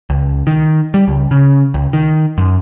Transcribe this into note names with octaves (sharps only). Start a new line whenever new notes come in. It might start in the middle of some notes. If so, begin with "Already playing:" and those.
C#2
D#3
G3
C#2
C#3
C#2
D#3
F#2